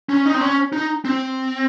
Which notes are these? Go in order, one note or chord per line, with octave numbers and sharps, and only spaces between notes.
C#4
D#4
C4
C#4
D#4
C4